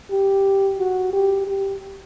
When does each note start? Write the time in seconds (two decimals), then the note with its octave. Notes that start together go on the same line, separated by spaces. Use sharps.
0.11 G4
0.79 F#4
1.13 G4
1.48 G4